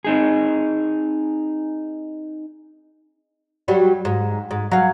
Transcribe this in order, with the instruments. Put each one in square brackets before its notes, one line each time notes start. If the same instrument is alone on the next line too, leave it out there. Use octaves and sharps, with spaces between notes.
[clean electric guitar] C4 D#4 G#4
[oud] F#3 G3 F#4
G#2
G#2
F#3 F5